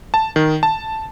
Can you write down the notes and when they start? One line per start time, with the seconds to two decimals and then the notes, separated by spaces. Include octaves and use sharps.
0.14 A5
0.36 D#3
0.63 A5